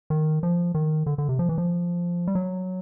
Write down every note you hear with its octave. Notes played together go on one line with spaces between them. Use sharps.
D#3
F3
D#3
D3
D3
C3
F3
E3
F3
G3
F#3